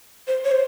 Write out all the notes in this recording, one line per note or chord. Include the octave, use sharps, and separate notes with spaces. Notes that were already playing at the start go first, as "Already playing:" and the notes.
C5
C#5
C5